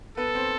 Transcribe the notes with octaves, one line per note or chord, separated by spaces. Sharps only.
B3 A4 B4
C4 C5